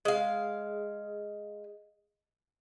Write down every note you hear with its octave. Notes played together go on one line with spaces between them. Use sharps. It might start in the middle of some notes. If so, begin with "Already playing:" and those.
G#3 F5